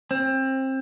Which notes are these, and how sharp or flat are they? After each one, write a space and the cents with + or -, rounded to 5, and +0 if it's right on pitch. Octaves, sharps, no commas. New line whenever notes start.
C4 +25